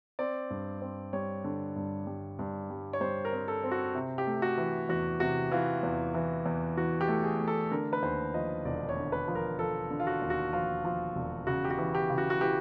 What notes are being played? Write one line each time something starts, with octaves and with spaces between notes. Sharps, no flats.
C4 D5
G2
C4
G3 C#5
D3
G2
G3
G2
G3
C#5
G3 C5
A#4
C4
A4
C4
F#4
C3
G4
A3
F#4
E3
E2 F#4
C3 F#4
E3 F4
E2
E3
E2
E3 F#4
G4
A3
G#4
A3
A4
D3 A#4
B4
D#2 C5
F3 D#5
E1 D5
C#5
D3
B4
F3
A#4
F3 A4
D3
F4
F#4
D#2
F#4
F3 F4
F3
E1
C#3 F#4
G4
F#4
E3
G4
C#3
F#4
F#4
E3 G4